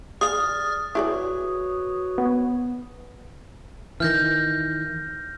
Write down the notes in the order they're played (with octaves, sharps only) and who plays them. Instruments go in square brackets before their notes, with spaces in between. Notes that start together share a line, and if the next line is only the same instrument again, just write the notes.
[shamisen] G#4 F5 [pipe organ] D5 F6 A6 [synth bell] D#6
[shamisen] E4 G#4 D5 [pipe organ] F#4 B4 C#5
[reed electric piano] B3
[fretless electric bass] D#3 E3 [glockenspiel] F6 G6 A#6